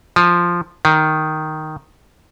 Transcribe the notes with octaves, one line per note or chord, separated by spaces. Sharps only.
F3
D#3